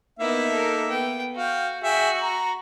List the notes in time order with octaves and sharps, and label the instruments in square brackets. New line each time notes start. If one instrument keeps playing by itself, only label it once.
[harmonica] A#3 D#4 E5 [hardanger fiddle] B3 E4
[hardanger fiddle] A4 A#4
B3 G5
[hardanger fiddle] F#4 [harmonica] F5 G5
[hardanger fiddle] F#4 [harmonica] G#4 E5 G5
[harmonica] A#5